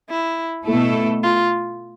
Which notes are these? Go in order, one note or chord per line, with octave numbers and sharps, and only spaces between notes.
E4
B2 A3 E4 A4
F4